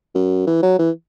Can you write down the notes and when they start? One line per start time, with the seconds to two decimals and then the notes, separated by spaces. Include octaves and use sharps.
0.15 F#2
0.47 E3
0.63 F#3
0.79 E3